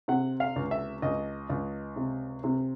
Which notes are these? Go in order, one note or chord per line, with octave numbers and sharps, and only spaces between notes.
C3 F#5
F5
C#2
E5
C#2 D#5
C#2
C3
C3